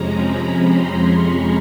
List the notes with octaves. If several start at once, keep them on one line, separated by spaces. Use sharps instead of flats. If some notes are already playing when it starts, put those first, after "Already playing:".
Already playing: F2 C3 F3 G#3 C#4 A#5
B5
C6
C#6